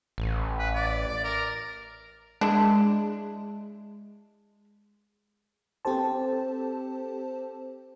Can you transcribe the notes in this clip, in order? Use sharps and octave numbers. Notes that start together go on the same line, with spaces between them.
A1
B4
D5
A#4
G#3 D4 E4
C4 G4 A4 C5 A5